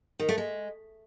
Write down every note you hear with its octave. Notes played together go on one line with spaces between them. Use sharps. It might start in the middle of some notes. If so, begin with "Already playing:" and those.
D#3
A3
G#3